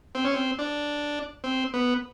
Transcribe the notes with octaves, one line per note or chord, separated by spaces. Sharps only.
C4
C#4
C4
D4
C4
B3